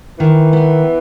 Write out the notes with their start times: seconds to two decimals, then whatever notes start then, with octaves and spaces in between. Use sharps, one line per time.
0.19 D#3 E3
0.53 B3